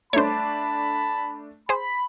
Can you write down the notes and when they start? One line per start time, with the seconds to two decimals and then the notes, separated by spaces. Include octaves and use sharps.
0.13 A3 D4 C5 C#5 A5 B5
1.69 G#4 C5 B5